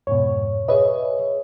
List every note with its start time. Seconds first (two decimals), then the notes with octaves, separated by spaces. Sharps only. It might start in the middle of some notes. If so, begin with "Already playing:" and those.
0.07 F2 G#2 B2 C#5
0.68 G#4 B4 C#5 D#5 E5